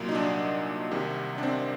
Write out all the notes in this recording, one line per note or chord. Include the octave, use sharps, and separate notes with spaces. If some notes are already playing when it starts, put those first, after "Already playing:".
Already playing: C2 A#2 F#3
D#4
D4
C2 C3 D#3
D4
C4